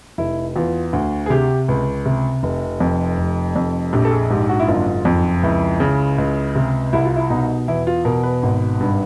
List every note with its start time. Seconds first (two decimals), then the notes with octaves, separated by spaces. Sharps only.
0.18 F1 E4
0.56 E2 F4
0.93 D2
1.26 G#4
1.30 C3 G4
1.68 C#2
2.06 C3
2.43 F1
2.80 F2
3.18 F1
3.56 F2
3.93 A#1 G4
4.05 A4
4.11 G#4
4.30 G#2 G4
4.49 F#4
4.60 E4
4.68 F#1 F4
5.05 F2
5.43 C#2 E4
5.80 C#3
6.18 C#2
6.55 C3
6.93 C2 E4
7.05 F4
7.16 E4
7.30 B2 D#4
7.68 E2 E4
7.87 F4
8.05 B2 A#4
8.23 B4
8.43 G#1
8.80 G2